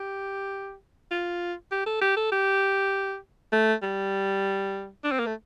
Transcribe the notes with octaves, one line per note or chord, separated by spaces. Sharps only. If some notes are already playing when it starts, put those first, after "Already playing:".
Already playing: G4
F4
G4
A4
G4
A4
G4
A3
G3
D4
C4
A#3
A3